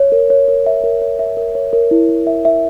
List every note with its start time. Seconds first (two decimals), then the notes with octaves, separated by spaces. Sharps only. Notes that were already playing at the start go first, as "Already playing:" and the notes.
Already playing: C#5
0.12 A#4
0.30 C#5
0.48 A#4
0.66 E5
0.84 A#4
1.02 C#5
1.19 E5
1.37 A#4
1.55 C#5
1.73 A#4
1.91 E4
2.09 E4
2.27 E5
2.45 E5